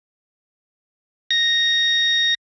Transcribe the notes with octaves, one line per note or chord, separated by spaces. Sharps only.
A#6